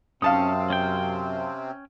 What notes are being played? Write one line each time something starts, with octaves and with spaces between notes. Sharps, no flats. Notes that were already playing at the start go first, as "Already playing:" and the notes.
F#2 C3 C4 C#4 F5 A5 D#6
C#4 G5